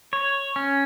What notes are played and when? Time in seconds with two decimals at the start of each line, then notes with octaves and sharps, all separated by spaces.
0.13 C#5
0.56 C#4